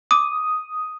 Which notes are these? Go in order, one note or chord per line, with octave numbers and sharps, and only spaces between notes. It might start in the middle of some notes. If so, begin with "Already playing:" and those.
D6 D#6